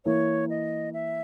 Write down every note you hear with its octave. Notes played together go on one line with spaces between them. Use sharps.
E3 A#3 E4 C#5
D#5
E5